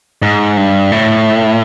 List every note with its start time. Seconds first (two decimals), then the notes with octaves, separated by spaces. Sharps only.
0.22 G#2
0.57 G2
0.92 A2